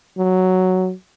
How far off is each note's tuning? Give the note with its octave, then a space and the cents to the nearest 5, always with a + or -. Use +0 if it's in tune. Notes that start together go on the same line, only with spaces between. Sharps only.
F#3 +5